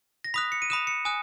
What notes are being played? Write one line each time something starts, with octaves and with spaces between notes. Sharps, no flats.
A#6
B5 D#6 F#6 B6
C#7
D#7
B5 D#6 F#6 E7
C#7
G#5 D#6 F#6